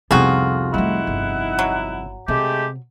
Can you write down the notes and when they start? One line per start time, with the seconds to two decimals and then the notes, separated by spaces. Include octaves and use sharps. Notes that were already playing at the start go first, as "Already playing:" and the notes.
0.11 C2 F2 C3 D#3 B3 F4 F#4 G#4
0.74 G3 A3 D#4 E4 F#5
1.07 G1
1.59 F#3
2.28 C3 G#3 A3 G4